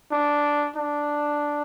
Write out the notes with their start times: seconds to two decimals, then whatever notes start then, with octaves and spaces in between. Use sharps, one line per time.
0.12 D4
0.76 D4